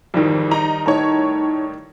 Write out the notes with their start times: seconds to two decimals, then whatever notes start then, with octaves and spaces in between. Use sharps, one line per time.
0.14 F2 G#2 D#3 E3 G3
0.51 D#4 A#5
0.86 A2 D#4 C#5 A5 A#5